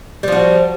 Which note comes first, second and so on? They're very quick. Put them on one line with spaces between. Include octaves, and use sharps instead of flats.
G3 F3 F#4